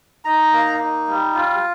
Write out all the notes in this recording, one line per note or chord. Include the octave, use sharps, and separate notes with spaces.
D#4 A#5
A#3
D#4
G3
F4